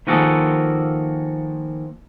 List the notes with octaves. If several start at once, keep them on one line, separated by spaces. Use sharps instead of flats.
D#3 F3 A#3 F#4 G#4 A4